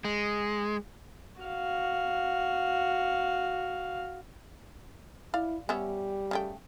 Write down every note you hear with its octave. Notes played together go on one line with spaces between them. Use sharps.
G#3
F#4 F5
E4 D5 F5
G3 B3 C#4 E5
C#3 A3 G5